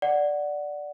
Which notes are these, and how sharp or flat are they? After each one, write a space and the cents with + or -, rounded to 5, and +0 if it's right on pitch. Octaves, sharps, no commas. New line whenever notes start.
D5 +0 F#5 +0